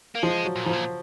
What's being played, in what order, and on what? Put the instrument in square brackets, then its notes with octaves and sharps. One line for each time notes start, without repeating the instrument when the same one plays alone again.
[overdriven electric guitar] A#3
[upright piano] F3 [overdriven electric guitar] G#3
[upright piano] F#3
[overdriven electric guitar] A#2
[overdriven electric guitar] G#2 [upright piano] F3
[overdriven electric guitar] A#2